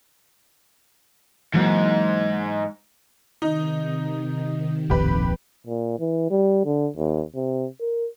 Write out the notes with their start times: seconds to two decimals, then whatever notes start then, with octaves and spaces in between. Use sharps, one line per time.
1.54 G#2 E3 F#3 A#3
3.42 C3 D#3 D#4
4.90 D1 A#1 F2 G4 B4
5.67 A#2
5.99 E3
6.30 G3
6.65 D3
6.96 D#2
7.35 C3
7.80 A#4